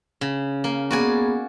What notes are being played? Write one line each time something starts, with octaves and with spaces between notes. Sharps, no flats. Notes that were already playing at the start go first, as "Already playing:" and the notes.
C#3
A#3
A#3 B3 F#4 G#4 D5 G#5